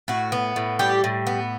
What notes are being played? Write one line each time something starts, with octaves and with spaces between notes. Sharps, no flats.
A2 F#4
B3
A2
G3 G4
A2
B3